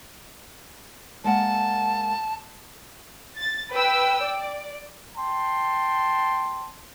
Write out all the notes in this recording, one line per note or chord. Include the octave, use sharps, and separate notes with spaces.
G#3 A#3 F#5 A5
A6
B4 G5 E6
D5
G5 A5 C6